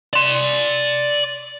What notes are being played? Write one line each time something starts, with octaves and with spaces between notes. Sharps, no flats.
D5 C6